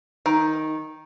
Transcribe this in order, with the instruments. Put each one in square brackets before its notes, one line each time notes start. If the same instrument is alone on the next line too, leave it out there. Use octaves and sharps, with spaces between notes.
[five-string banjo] D#3